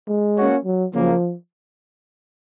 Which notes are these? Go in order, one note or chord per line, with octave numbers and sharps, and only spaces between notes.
G#3
A#3 C#4 F#4 C#5
F#3
C#3 F3 F#3 A#3